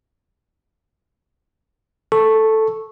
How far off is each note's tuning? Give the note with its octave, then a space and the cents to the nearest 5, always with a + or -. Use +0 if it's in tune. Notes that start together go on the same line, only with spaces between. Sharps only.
A4 +0 C#6 -10